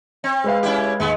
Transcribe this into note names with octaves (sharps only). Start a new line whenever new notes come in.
C4
G#3 B4 F5
C#4 E4 G4
D#2 G#3 B3